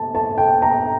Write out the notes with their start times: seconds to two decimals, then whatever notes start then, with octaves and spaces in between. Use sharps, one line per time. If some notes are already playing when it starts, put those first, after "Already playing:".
Already playing: A5
0.15 A5
0.38 G5
0.62 A#5